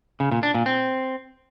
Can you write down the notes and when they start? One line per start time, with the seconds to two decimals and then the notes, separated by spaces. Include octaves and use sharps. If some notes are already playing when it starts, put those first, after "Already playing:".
0.20 C#3
0.32 A#2
0.43 D4
0.54 A#2
0.66 C4